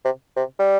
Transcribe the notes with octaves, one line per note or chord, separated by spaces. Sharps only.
C3
C3
G3